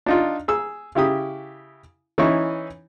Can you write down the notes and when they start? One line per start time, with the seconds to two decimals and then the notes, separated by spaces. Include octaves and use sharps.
0.06 D4 D#4 F4
0.48 G#4 E6
0.95 C#3 E4 G4 D#6
2.18 E3 C#4 D#4 E4 C#6